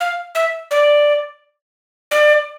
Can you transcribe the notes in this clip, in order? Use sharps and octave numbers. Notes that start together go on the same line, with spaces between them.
F5
E5
D5
D5